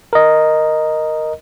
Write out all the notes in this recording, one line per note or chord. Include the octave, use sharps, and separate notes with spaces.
A#4 D#5